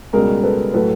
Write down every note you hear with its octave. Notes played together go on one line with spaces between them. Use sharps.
C#2 B2 G3 G#4 A#4
A4 B4
A2 F#3 A3 A4 B4